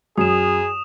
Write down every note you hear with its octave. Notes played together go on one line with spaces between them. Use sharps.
F#2 G#4 D#6 E7